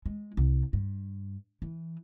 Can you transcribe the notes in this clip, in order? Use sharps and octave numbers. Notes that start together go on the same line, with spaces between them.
G#3
C2
G2
E3